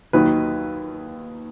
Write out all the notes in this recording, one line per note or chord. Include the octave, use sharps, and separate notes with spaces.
D#2 D#3 F#3 B4